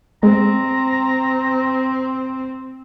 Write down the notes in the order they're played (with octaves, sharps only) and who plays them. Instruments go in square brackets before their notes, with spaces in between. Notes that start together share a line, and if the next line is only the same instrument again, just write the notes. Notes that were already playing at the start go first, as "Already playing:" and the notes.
[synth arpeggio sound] G#3 [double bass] C4 [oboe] A#5